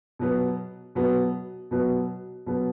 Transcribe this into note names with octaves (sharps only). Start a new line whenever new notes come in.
B2 F#3 B3
B2 F#3 B3
B2 F#3 B3
B2 F#3 B3